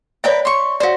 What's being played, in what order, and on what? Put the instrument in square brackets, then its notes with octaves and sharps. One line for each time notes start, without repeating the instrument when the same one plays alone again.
[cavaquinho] A#4 B4 G5 [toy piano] C#5 D5 E5
[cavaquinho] C6 C#6
[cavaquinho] F#4 C5 [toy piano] D5 F5